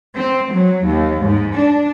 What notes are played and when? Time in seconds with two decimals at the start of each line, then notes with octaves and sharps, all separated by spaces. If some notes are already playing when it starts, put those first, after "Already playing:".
0.15 C4
0.51 F#3
0.86 D#2
1.23 G#2
1.55 D4